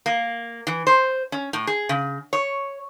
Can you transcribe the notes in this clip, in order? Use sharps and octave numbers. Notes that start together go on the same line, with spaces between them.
A#3
E3
C5
C#4
A2
G#4
C#3
C#5